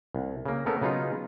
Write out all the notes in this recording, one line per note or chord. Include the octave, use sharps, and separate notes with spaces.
C2
C#3 A#3
A3 B3 C#4 A4 A#4
C#3 F#3 B3 D#4 F4